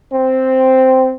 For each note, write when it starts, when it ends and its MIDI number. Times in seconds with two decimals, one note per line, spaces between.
0.12 1.13 60